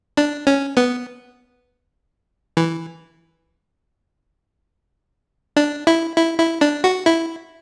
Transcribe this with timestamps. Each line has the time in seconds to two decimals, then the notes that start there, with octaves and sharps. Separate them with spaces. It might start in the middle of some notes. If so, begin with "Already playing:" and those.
0.17 D4
0.47 C#4
0.77 B3
2.57 E3
5.56 D4
5.87 E4
6.16 E4
6.39 E4
6.61 D4
6.84 F#4
7.06 E4